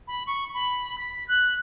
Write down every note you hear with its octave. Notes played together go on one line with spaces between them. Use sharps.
B5
C#6
B5
B6
F#6